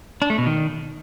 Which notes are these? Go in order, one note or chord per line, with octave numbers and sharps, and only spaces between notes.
D4
A3
B2
D#3